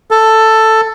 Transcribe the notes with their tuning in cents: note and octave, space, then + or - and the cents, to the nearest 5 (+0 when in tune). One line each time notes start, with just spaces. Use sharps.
A4 +5